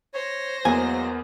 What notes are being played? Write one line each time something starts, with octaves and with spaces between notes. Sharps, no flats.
C5 C#5 A#6
E2 F#3 G#3 A#3 B3 G#5